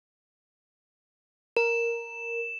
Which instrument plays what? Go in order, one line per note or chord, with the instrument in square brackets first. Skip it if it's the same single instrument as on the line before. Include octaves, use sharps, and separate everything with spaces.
[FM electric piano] A#4 [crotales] E7